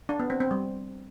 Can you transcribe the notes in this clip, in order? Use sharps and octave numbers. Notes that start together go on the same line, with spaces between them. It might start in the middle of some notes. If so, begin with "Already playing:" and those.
D4
B3
C4
C4
G3